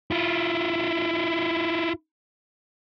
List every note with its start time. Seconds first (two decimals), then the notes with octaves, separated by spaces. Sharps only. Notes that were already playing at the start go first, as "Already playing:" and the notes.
0.11 E4 F4